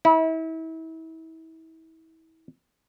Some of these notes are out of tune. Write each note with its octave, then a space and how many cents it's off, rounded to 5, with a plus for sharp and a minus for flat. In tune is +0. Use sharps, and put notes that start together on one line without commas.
E4 -35